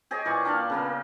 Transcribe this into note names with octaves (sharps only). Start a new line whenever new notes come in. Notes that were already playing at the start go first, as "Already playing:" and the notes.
G4 G#4 C#5 D#5
A#2 E3 D5 C#6
A#3 D4 D5 F5
C#3 A#3 B3